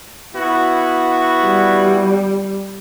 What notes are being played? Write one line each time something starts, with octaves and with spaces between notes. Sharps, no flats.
B3 E4 F#4
G3